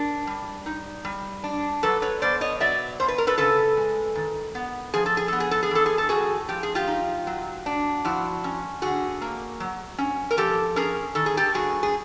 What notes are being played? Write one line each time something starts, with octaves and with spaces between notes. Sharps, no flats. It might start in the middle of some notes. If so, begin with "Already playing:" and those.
Already playing: D4 A#4
G3
D#4
G3
D4
F#3 A4 B4
B4 C#5
B2 C5 D5
C#5 D#5
F#3 D5 E5
B2 C5
B4
A#4
A4 B4
C#3 A4 B4
G#3
D#3
B3
F3 G#4
A4
G#4
B3 A4
G#4
A4
G#4
E3 A4
G#4
A4
A2 F#4 G#4
F3 G4
G#4
F4 G4
D#4
F#3
D4
F3 E4 F#4
C#4
D3 F#4 G#4
A#3
F#3
C#4
A#4
F3 G4 A4
C#4 G#4 A#4
D#3 A4
G#4
G4 A4
G2 F#4 G#4
G#4